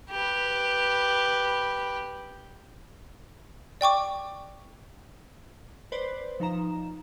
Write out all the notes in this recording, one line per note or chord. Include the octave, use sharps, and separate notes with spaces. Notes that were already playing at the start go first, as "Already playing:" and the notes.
G4 B4
D5 G5 C#6 D6
B4 C5 D5
F3 D#4 F5 A#5 E7